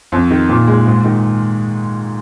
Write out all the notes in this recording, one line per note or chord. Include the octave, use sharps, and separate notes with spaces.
F2
D#3
A#2
G#3
G#2
D#3